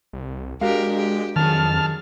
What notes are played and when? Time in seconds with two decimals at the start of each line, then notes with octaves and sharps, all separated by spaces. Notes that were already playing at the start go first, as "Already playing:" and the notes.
0.13 C2
0.61 G#3 D4 F#4 G4 A#4 F5
0.97 G4
1.36 F2 D#3 F#3 G#4 A5 F6